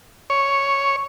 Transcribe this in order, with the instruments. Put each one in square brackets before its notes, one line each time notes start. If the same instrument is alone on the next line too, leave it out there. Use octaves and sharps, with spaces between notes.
[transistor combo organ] C#5